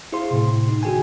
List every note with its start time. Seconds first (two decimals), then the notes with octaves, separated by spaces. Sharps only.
0.12 E4 G#4 C5 F5 C6
0.31 A2 C3
0.69 D#4
0.83 D3 F#4 G#4 G5 G#5